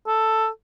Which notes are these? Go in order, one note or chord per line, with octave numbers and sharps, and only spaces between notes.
A4